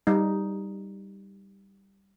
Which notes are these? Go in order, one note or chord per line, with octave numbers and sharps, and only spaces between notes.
G3 D#4